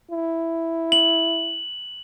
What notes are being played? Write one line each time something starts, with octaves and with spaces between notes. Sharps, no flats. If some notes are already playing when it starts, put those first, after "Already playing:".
E4
F#7